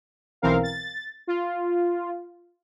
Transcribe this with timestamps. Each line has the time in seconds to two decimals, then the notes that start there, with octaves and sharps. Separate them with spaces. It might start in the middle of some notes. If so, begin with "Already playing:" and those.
0.42 B1 E3 C4 A#4 F5
0.63 A6
1.27 F4